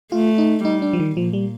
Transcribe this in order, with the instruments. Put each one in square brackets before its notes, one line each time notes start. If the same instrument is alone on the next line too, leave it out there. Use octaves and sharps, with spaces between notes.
[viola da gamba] A3 [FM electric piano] F4
[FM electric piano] D#4
[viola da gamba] G3 [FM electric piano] D#4
[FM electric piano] D4
F3
D#3
[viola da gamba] A#2 [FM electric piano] F3
[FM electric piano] G3